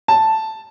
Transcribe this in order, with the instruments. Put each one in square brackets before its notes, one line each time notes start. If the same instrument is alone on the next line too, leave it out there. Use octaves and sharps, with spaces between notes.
[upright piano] A5